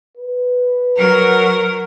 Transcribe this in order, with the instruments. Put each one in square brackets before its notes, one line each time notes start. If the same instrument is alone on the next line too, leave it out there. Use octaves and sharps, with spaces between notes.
[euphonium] B4
[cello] F#3 [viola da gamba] A#4